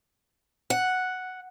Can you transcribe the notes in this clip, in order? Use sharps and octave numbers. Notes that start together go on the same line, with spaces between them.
F#5